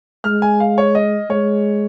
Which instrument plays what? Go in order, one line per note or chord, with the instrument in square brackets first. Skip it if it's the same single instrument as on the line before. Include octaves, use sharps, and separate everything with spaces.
[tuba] G#3 [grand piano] F6
[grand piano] G#5
F5
C#5
D#5
[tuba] G#3 [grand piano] C#5